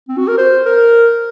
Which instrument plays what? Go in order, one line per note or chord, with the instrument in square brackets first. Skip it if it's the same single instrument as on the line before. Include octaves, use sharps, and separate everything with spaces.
[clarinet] C4
F#4
A#4
C5
A#4